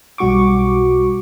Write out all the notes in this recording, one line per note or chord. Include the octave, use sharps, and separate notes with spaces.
B1 G3 F#4 C#6 D6